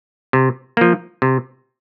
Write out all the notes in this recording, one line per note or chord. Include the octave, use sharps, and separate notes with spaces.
C3
F3 A#3
C3